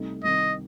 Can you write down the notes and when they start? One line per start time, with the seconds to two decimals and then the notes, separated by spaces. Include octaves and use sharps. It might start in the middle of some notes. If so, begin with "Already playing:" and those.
Already playing: C2 C3 A3 D#4
0.24 C2 C3 D#3 D#5